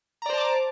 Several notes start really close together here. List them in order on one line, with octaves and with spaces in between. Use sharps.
A#5 D5 C5 A5 D6